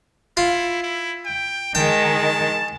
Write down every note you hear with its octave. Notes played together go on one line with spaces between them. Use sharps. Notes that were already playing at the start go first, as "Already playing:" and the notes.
E4 F4
E4
G5
D#3 G#3 G5 A5